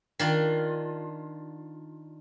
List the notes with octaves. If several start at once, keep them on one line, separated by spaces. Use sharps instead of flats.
D#3 D4 F4